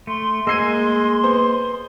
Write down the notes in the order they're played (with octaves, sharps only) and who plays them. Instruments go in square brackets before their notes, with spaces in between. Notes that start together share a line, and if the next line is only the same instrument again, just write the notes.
[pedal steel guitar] A3 [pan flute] C6
[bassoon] G#3 [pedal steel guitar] A#3 G#5 [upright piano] E6 C7 D#7
[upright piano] B3 C5